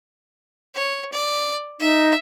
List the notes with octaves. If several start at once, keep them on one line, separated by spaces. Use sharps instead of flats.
C#5
D5
D#4 E5